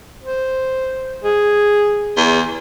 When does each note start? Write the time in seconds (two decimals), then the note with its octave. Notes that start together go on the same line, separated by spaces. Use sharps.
0.24 C5
1.24 G#4
2.17 E2